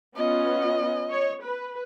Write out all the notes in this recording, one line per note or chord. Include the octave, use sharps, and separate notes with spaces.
B3 C#4 F4 D#5
C#5
B4